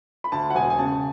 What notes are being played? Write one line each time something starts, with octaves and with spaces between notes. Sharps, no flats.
B5
D2 A5
F#5
E1 G#5
G#5
C#3 A5